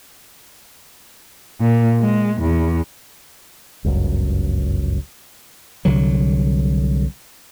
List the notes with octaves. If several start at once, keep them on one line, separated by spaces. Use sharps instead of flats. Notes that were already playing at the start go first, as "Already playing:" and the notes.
A#2
G#3
E2
G1 C#2 F#2
C2 D3 F#3